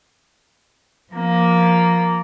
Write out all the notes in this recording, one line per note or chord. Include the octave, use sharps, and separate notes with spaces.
F3 A#3